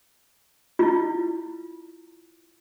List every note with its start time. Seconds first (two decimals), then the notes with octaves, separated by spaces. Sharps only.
0.79 E4 F4